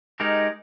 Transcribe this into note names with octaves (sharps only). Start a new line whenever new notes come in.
G#3 D#4 G4 A#4